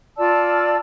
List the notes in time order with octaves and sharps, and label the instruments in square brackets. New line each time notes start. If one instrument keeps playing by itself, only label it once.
[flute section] F4 D5 A5 E6